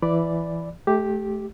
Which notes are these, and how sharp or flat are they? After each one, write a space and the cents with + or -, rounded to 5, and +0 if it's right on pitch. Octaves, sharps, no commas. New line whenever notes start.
E3 +15 D5 +0 B5 +0
A3 -30 G4 +0